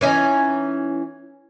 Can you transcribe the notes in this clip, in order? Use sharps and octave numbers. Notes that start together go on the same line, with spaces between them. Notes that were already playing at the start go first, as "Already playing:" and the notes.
E3 C#4 D#4